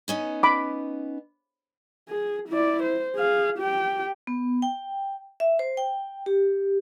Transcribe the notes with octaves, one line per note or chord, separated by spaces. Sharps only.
B3 C#4 D#4
B5 D6
G#4
E4 D5
C5
G#4 F5
G4 G5
B3
G5
E5
C5
G5
G4